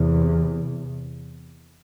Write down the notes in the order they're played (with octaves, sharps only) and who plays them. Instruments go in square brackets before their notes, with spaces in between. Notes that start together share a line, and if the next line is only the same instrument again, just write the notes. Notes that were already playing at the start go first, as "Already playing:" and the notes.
Already playing: [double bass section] E2 C3